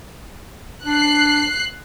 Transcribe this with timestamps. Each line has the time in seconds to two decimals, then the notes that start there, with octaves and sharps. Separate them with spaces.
0.85 D4 F#6 C7